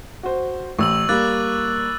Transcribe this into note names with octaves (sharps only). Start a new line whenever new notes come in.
F#4 C5
A1 C#6 E6 F#7
G3 A#3 D6 F#6 A6